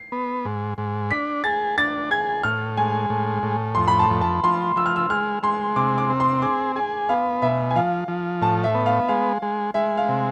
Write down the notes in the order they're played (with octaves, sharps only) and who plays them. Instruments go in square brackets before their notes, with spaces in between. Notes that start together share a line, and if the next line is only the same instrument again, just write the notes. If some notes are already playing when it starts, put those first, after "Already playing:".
Already playing: [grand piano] C7
[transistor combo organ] B3
G#2
G#2
[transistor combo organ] D4 [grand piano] B6
[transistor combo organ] G#4 [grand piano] A6
[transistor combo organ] D4 [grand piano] A6
[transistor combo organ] G#4 [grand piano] G#6
[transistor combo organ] A2 [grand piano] F6
[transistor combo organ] G#3 [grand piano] G#5
[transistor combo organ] A2
A2
[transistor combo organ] F2 [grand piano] C6
[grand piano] B5
A5
[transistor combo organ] F2
[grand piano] A5
[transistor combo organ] F3 [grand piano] C6
[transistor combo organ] F3 [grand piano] E6
[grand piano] F6
E6
[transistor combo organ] G#3 [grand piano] F6
[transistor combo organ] G#3 [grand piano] C6
[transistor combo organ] C3 [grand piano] D6
[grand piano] D6
[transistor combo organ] C4
[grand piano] C6
[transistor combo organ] G#4 [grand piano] D6
[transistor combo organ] G#4 [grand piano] G#5
[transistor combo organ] B3 [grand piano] F5
[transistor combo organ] B2 [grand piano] E5
[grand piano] G#5
[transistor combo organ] F3 [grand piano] F5
[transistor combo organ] F3
[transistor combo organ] A2 [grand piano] A5
[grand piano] E5
[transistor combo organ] B3
[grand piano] F5
[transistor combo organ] G#3 [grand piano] F5
[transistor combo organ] G#3
[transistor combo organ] G#3 [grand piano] E5
[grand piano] F5
[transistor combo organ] C3